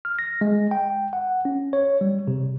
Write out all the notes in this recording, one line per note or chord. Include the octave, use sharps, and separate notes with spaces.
F6
A#6
G#3
G5
F#5
C#4
C#5
G3
C3